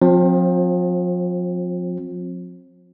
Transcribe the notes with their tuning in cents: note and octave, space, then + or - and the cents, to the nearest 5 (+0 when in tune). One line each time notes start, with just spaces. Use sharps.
F3 +35 C4 +10